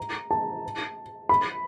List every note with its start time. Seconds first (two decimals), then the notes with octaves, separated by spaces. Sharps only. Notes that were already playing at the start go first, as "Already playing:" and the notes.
Already playing: A#5
0.31 A5
1.29 B5